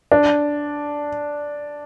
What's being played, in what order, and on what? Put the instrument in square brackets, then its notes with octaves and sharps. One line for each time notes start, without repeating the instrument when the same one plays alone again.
[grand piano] D4